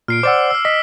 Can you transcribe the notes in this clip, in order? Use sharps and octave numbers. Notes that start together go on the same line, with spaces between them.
A#2 F6 C7 D7
C5 D5 F#5 D6 E6
E6 F6
D#5 B6